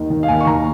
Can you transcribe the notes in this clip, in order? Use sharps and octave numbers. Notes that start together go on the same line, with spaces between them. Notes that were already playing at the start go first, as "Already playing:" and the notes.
Already playing: D#2 D#3
D#3
F5
D#2 G#5
C#6
D#2 A#5